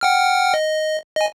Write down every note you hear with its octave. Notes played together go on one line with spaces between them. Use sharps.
F#5 G5 F6
D#5
D#5 G#5